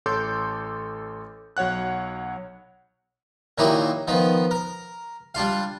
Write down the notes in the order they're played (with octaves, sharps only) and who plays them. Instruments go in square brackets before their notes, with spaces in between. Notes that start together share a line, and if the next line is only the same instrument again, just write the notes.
[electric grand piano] A1 A4 C#5 C6 D6 G6
B1 F#3 C#5 F#5 F#6
[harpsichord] A#2 D#3 F#3 D#4 E4 G4
D#3 F3 B3
A#4
G3 D4 F4 F5